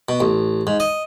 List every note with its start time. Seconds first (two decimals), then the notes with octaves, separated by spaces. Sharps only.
0.09 B2
0.20 A1
0.67 G#2
0.80 D#5